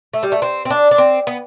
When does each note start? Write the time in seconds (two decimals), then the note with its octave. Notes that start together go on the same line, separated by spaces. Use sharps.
0.14 A3
0.23 G3
0.32 A3
0.42 C4
0.65 C4
0.70 D4
0.91 D4
0.98 C4
1.27 B3